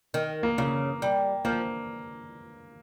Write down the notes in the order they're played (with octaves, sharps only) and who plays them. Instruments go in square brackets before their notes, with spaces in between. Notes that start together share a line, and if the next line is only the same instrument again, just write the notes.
[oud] D#3
[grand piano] A#3
[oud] C#3 [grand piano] A#3
[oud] G3
[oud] F3 [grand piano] A#3